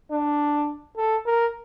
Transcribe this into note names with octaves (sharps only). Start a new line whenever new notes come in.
D4
A4
A#4